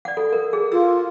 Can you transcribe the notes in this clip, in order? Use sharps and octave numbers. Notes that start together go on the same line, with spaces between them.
D5 F#5
A4
A#4
G#4
F4 E6